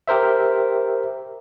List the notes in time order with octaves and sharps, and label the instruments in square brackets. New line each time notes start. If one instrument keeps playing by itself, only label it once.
[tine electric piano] G4 A#4 C5 E5